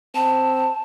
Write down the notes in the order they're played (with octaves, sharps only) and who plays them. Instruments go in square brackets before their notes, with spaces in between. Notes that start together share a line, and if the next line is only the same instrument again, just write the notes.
[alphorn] C4 [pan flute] A5